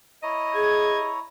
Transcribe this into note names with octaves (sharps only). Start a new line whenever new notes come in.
E4 C#5 D#5 A#5
G#4 G#6